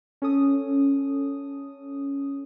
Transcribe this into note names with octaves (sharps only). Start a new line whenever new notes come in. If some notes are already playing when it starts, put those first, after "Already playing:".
C#4 A4 D#6